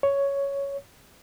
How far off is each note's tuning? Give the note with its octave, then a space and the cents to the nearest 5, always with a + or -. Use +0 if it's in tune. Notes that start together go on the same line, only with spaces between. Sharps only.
C#5 +5